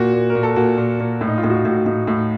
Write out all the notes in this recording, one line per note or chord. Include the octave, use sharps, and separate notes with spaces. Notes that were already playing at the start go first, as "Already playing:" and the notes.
Already playing: A#2 F#4
A#2
A#4
A#2
A4
A#2 F#4
A#2
A#2
A2
D#4
F4
A2
F#4
F4
A2
F#4
A2 D#4
A2